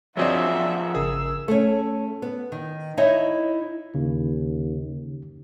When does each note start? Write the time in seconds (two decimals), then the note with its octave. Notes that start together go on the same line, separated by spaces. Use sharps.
0.17 F3 F#3 C4 D4 G#4 A#4 E5 F#5
0.95 G#1 C#3 G#4 A#4 E6
1.48 A3 C#4
2.22 B3
2.52 D#3
2.97 D#4 E4 C#5 D#5 E5
3.95 D#2 C#3